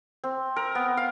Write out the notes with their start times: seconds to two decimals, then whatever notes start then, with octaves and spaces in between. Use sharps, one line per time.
0.24 C4
0.56 A#4
0.75 B3
0.97 F5